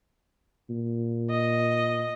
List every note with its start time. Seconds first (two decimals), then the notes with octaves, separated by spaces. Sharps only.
0.70 A#2
1.30 D#5